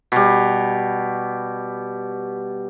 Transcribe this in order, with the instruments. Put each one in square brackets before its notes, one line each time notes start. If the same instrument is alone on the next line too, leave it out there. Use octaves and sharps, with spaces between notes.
[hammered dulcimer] B2 G3